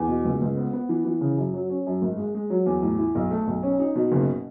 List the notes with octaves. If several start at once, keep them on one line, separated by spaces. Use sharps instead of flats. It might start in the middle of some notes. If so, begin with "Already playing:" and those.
Already playing: E2
B2
C#2
C#2
B3
B3
E3
E3
C#3
F#2
F#3
C#4
F#2
G#1
G#3
G#3
F#3
E2
A2
E4
B1
A3
B1
C#4
D#4
B2
F#1